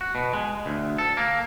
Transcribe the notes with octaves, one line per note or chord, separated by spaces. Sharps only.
F#4
B2
G#3
D2
A4
A#3